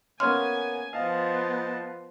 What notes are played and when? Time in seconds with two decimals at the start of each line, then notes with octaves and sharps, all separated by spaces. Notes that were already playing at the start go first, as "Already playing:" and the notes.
0.20 A#3 B3 C#4 G#5 C6 F6
0.93 F3 B3 D#5 F5 A5